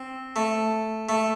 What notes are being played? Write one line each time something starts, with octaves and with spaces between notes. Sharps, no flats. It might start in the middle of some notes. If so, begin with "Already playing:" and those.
Already playing: C4
A3
A3